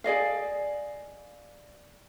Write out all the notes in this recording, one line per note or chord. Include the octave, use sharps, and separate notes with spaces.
G#4 D5 D#5 F5